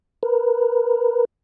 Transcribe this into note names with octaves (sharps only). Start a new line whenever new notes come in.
A#4 B4